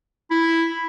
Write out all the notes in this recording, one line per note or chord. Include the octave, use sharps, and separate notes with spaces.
E4